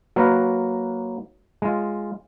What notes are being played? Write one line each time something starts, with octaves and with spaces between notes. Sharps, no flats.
F#3 A#3 F#4 A#4 B4
G#3 F4